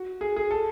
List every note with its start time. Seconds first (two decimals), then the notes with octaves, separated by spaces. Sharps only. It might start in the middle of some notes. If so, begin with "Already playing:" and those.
Already playing: F#4
0.21 G#4
0.36 G#4
0.51 A4